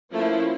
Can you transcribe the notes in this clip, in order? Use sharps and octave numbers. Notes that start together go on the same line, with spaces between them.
F3 A3 A#3 C#4 E4